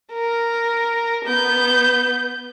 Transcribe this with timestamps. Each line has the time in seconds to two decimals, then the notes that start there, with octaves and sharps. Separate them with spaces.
0.13 A#4
1.25 B3 G6